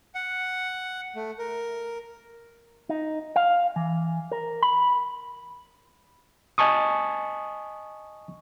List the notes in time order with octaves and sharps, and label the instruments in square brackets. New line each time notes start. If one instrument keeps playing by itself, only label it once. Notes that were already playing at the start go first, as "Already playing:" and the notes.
[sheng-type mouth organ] F#5
A3
A#4
[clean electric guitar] D#4
F5
E3
A#4
B5
[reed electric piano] D#5 G#5 A5 C#6 D#6